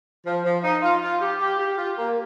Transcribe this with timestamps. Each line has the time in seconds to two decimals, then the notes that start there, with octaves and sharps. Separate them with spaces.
0.25 F3
0.44 F3
0.63 D#4
0.82 F4
1.01 F4
1.20 G4
1.40 G4
1.59 G4
1.77 F4
1.97 A#3